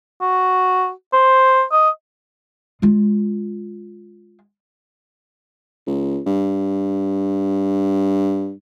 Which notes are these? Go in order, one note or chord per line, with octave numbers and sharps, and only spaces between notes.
F#4
C5
D#5
G#3 F4
C#2
G2